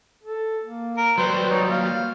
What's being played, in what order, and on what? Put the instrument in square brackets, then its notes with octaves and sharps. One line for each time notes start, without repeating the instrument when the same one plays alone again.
[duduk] A4
A#3
[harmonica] A#4
[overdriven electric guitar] F#3 G3 [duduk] B4 [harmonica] C5
[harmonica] D#4 [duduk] C#5
[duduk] A#3 [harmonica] F5